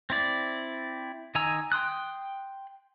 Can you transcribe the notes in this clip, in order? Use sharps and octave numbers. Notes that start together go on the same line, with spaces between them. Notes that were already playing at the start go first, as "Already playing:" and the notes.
C4 E4 D5
D#3 D#5 G#5 A#5 E6
G5 C6 D#6 F#6